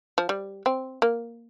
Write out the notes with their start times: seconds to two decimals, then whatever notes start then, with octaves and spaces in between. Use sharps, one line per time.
0.18 F3
0.29 G3
0.66 C4
1.02 A#3